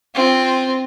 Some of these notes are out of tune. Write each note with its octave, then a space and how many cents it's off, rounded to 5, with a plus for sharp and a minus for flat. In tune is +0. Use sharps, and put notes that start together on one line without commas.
C4 +0 F4 +0